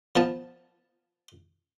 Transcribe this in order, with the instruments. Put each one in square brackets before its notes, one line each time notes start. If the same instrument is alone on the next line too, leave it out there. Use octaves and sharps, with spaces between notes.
[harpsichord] F3 B3 A5